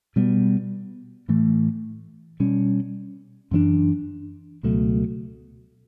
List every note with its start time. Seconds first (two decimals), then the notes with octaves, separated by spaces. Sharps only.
0.16 B2 G3 B3
1.28 A2 E3 A3
2.40 B2 G3 C#4
3.51 F#2 E3 B3 D4
4.63 C#2 B2 F#3 A3